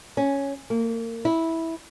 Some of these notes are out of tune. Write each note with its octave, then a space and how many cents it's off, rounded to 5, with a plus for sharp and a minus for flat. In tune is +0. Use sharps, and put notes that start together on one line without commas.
C#4 +0
A#3 -30
E4 -10